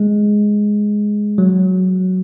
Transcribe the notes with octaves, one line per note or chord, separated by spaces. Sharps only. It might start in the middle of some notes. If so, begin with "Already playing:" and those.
Already playing: G#3
F#3